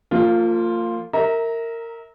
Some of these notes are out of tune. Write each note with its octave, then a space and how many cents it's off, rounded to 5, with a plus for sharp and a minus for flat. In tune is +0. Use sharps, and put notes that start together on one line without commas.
F3 +0 A#3 -40 F4 +0
A#4 -20 E5 -30 A#5 +0